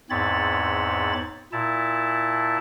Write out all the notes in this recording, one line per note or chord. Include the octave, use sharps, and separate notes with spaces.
E2 G#2 C4 C#5 B5 A6
A#2 E4 A5